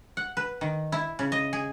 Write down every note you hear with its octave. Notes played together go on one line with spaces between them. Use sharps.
F#5
B4
D#3
E4
C#3
D#5
G#4